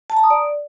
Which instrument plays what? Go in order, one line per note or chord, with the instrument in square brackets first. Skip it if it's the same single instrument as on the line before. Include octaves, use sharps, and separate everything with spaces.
[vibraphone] A5
A#5
D#6
D5